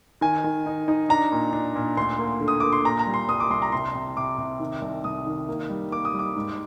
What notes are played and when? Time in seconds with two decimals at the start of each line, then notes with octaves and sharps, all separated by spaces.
0.21 D#3 G#5
0.44 D#3
0.66 D#4
0.88 D#4
1.09 D4 A#5
1.32 A#2
1.53 D4
1.76 A#2
1.97 D2 C6
2.19 A#3
2.40 D3
2.48 D#6
2.60 A#3 D6
2.72 C6
2.85 A#2 A#5
2.99 A#5
3.07 G3
3.14 C6
3.28 C2 D#6
3.40 D6
3.50 C2 C6
3.62 A#5
3.72 C3 C6
3.95 C3
4.17 C3 D6
4.38 C3
4.60 D#3
4.82 C2
5.04 C2 D#6
5.27 D#3
5.49 A#3
5.69 G3
5.91 A#3 D6
6.05 D#6
6.14 G3
6.19 D6
6.36 G#2